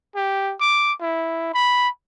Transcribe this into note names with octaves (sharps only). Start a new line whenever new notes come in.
G4
D6
E4
B5